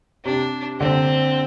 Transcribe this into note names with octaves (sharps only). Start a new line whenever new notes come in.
C3 D4
D3 C4